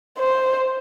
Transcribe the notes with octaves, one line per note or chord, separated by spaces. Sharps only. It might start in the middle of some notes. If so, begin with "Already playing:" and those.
C5